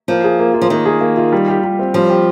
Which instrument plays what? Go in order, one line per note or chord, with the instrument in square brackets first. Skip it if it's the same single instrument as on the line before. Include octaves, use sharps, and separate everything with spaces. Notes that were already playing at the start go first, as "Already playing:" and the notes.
[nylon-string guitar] F3 [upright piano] A#3
[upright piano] G#4
A#3
F4
[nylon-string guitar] F3
[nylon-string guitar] D#3 [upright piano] A#3
[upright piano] G#4
A#3
F4
G3
G4
G3
C4
[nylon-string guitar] F3 [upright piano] G3
[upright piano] G4